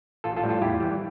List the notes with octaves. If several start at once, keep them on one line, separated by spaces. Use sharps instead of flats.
A1 F4 A4
F4 A4
A2 G3
F4 A4
E2 E4 G4
E3 G3